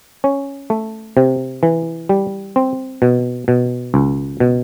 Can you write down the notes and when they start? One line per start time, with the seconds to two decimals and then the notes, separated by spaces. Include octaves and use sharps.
0.24 C#4
0.70 A3
1.17 C3
1.63 E3
2.09 G3
2.56 C4
3.02 B2
3.48 B2
3.94 C#2
4.40 B2